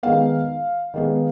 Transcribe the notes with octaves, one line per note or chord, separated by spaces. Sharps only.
D#3 G#3 B3 F5
D#3 G#3 B3